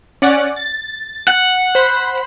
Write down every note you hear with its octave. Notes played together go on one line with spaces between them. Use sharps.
C#4 D5 F#5
A6
F#5
C5 B5